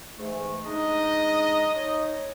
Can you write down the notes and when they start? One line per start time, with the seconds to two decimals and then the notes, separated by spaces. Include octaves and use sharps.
0.18 G#2 E3 A3
0.65 G#3 D4 D#4 D#5
1.74 D#4 C#5